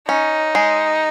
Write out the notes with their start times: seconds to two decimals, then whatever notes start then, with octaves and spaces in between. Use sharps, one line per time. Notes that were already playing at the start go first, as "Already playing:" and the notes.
0.09 C#4 D#4
0.55 G#3